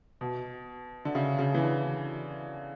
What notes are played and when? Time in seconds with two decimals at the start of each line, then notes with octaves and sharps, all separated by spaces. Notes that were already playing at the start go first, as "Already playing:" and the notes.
0.21 B2
1.05 D3
1.15 C#3
1.39 C#3
1.54 E3
1.62 D3